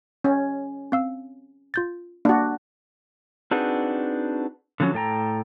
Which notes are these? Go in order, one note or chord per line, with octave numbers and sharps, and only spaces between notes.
C#4
C4 F5 E6
F4 G6 A6
A#3 D4 F#4
C4 D4 D#4 F#4 G#4 B4
D3 F3 F#3 C4 C#4
A2 A4 G5 A#5